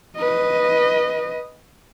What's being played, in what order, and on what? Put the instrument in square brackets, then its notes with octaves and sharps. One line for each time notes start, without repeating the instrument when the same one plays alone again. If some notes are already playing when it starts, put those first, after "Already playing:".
[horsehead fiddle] B4 D#5